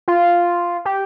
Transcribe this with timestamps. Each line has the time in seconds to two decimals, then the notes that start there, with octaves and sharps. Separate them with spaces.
0.08 F4
0.85 G4